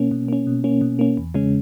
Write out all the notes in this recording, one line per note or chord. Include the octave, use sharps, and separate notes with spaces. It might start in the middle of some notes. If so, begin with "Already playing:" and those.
Already playing: B2 A#3 C#4
B2
A#3 C#4
B2
A#3 C#4
B2
A#3 C#4
E2
C#3 G#3 C#4